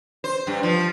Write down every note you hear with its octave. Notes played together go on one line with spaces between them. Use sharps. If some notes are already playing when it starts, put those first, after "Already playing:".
C5
G2
F3